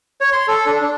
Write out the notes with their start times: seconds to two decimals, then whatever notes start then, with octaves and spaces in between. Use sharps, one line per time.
0.21 C#5
0.33 C6
0.48 A4
0.66 D4
0.81 D4